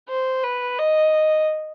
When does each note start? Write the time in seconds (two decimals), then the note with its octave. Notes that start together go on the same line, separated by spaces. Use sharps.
0.09 C5
0.44 B4
0.79 D#5